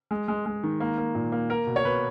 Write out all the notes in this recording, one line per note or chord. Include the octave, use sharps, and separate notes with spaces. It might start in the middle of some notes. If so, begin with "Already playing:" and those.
G#3
G#3
G#3
D#3
A#3
A#3
A#2
A#3
A#3 A#4
B2
C#5
B2 B4